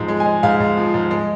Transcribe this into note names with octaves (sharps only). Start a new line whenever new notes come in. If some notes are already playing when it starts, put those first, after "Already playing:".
Already playing: G#2 F3
G#3
G#5
G#3
G#2 F5
G#2
F3
G#2
G#3